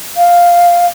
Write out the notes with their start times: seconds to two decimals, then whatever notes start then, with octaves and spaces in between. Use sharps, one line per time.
0.16 F5